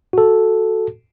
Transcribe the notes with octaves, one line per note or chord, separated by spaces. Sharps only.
F#4 A4